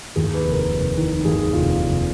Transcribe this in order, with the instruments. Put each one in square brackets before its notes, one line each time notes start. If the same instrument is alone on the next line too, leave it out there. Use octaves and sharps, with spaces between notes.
[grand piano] D#2 G#4
B4
F1
A#4
F1
D#3
D#2 G#4
F1 F4
F1